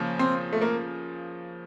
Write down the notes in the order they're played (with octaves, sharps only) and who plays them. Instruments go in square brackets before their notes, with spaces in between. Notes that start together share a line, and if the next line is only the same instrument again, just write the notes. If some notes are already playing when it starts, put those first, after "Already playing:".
Already playing: [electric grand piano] C#3 F3 A#3 C#4
[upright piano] C4
A3
A#3